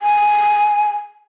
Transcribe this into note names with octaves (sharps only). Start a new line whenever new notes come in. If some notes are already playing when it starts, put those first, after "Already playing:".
G#5